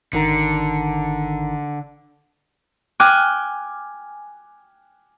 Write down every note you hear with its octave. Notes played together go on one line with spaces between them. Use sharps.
G#1 D3 D#3 A#5
G5 G#5 D6 F6 F#6